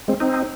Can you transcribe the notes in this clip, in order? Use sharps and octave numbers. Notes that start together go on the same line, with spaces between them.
G#3 C4
C4 D#4